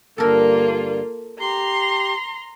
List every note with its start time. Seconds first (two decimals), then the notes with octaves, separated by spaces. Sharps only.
0.18 G2 D3 A#3 F4 A4 A#4
1.39 G4 A#5 C6